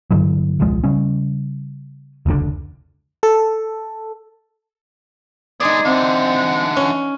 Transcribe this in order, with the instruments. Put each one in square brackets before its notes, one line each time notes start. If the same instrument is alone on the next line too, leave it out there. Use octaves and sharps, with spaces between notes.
[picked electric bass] G2 D3 E3 F#3
D#1 C2 F3 G#3
C#3 G3 C#4
F1 C#2 A#2 D3
[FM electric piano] A4
[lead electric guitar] G#3 B3 [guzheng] D#4 D5 [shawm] G#4
[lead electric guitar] D3 E3 [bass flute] C4 [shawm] F#5
[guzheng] C#4